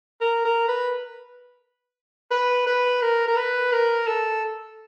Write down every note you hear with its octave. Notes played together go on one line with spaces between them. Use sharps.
A#4
A#4
B4
B4
B4
A#4
A#4
B4
A#4
A4